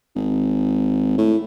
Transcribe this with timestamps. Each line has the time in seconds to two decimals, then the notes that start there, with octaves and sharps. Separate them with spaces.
0.16 G#1
1.18 A2